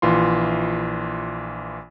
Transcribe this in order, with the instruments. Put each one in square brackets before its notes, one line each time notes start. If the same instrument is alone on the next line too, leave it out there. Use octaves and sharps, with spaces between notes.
[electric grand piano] A#1 E3 F4 C6